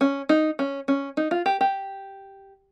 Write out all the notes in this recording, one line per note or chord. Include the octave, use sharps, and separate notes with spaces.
C#4
D#4
C#4
C#4
D#4
F4
G4
G4